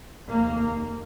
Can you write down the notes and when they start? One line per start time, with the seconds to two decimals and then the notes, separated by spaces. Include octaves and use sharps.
0.28 F1 D#2 A#3